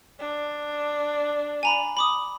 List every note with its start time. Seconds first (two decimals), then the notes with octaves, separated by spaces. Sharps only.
0.19 D4
1.63 G#5 A#5 B5
1.97 B5 D6 D#6